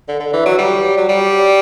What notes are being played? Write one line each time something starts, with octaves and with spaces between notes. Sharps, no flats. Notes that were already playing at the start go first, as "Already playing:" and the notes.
D3
D3
E3
F#3
G3
F#3
G3